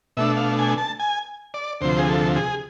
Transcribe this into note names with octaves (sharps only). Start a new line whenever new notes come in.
B2 A3 D4 E5
F5
G#5
A5
G#5
D5
D2 C3 F3 C5
G#4
A4
G#4